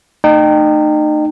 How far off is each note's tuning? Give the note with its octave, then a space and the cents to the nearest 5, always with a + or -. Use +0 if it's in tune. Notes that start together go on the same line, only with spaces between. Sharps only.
A3 +40 D#4 -35 G5 +0